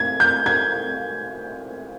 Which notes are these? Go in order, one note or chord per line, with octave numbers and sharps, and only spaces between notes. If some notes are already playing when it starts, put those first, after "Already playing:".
Already playing: G#6
G6
G#6